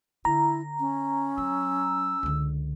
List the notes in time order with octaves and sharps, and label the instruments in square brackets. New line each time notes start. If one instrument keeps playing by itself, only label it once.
[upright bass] D3 [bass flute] E4 [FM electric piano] A#5
[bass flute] C#4
[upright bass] F#3 [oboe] E6
[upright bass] C#2 D3